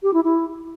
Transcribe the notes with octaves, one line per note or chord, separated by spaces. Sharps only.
G4
E4
E4